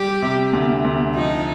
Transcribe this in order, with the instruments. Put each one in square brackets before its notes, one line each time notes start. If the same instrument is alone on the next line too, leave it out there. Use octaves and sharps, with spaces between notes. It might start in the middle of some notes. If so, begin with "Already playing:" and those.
Already playing: [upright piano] G3 [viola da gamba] G4
[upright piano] C3
D2
D2
[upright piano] F3 [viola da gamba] D#4